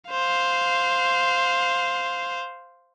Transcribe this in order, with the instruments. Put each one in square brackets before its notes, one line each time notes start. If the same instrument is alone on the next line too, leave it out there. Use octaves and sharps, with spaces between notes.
[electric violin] C5 F5